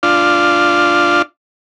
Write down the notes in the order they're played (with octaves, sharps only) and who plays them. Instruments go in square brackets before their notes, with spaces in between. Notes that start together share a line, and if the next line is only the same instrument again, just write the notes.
[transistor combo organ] D4 F4